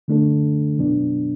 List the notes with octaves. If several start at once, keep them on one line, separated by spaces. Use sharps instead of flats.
D3 A3 D4 A4
B2 F#3 B3 D4